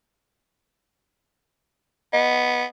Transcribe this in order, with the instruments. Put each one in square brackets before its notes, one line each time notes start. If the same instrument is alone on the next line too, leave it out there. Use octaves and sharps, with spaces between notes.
[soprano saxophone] B3 [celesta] D#5